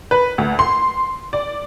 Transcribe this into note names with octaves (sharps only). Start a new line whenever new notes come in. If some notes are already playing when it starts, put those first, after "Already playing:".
B4
D2
C6
D5